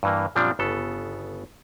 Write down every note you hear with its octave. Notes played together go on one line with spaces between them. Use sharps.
G2 E3 A#3
F#2 A#2 F3 G3 C4 D4
G1 C#3 B3 A4